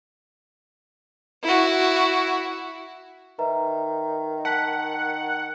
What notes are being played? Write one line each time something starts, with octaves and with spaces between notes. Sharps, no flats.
E4 F#4
D#3 B4 E5 A#5
F#5 A5 F#6 B6